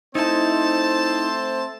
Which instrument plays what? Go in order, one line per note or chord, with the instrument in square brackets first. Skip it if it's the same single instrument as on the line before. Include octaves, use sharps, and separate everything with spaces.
[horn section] A3 C4 C5 [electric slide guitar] D#4 E4 [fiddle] A5